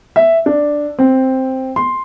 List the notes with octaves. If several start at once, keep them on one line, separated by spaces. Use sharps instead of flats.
E5
D4
C4
C6